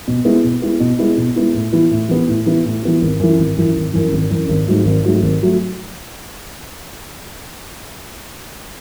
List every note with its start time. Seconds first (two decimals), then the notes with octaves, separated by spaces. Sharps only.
0.08 B2
0.25 G#3 B3 E4
0.44 B2
0.62 G#3 B3 E4
0.80 B2
0.99 G#3 B3 E4
1.17 B2
1.36 G#3 B3 E4
1.54 A2
1.73 E3 B3 E4
1.91 A2
2.09 E3 B3 E4
2.27 A2
2.46 E3 B3 E4
2.65 A2
2.83 E3 B3 E4
3.01 G#1
3.19 F#2 E3
3.38 G#1
3.57 F#2 E3
3.76 G#1
3.93 F#2 E3
4.11 G#1
4.30 F#2 E3
4.48 G#1
4.67 G#2 F#3 A3
4.85 G#1
5.04 G#2 F#3 A3
5.22 G#1
5.43 F#3 A3